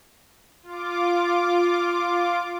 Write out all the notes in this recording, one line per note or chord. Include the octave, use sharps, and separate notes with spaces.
F4 D6